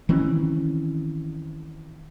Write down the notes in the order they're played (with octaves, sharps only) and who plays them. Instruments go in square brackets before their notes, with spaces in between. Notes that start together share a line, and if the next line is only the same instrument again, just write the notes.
[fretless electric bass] D#3 E3 C4 C#4